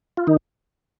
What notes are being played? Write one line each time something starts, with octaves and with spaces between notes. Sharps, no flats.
F4
D#3 D#4